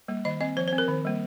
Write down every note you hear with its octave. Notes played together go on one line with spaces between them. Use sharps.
G3 A#3
D#3 D#5
C4 D#5
F3 C5
C5
C4
A#4
D#3
G3 A#3